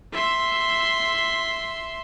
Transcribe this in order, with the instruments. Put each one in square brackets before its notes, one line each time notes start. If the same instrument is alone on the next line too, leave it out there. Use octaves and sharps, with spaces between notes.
[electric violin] E5 C6